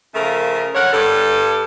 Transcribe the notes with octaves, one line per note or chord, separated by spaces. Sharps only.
C#3 F3 A3 A#4
D3 A#4 C#5 F#5
G2 A4